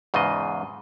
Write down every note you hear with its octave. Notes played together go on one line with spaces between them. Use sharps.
E2 G#2 C#3 F4 D#5